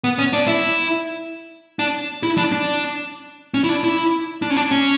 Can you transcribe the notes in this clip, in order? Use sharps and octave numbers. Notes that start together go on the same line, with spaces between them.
B3
C#4
D4
E4
D4
E4
D4
D4
C#4
E4
D4
E4
D4
C#4
D4
C#4